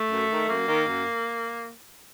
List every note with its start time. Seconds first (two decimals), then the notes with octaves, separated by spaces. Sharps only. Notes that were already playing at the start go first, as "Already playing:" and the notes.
Already playing: A3
0.10 F#2
0.29 D#3
0.48 F#2 A#3
0.67 D#3
0.88 F#2